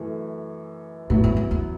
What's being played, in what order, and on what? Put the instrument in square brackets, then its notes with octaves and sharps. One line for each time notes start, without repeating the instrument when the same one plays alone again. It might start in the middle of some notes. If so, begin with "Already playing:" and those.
Already playing: [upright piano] F#2 E3 A3
[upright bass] A2 [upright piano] F#3 B3 E4
[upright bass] G#2
G#2
E2